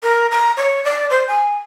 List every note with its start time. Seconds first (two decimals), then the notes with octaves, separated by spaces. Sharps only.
0.03 A#4
0.31 A#5
0.57 C#5
0.84 D5
1.10 C5
1.27 G#5